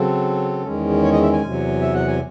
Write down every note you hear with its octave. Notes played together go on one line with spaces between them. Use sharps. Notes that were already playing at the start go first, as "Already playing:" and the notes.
Already playing: C#3 F#3 C4 A4
E2 D#3 G#3 C#4
C#5
D#5
E5
G#5
E2 C3 F#3
E5
F#5
G#5